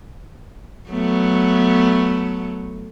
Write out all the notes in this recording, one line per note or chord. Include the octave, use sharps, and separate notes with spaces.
F#3 A3 B3